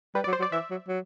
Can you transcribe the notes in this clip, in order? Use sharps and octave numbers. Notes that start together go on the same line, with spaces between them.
G3 B4
D5
F#3
C5
F#3
D5
E3 E5
F#3
F#3